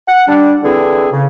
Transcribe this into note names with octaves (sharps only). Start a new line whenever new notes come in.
F#5
G3 D4
D3 E3 C4 E4 G#4
C#3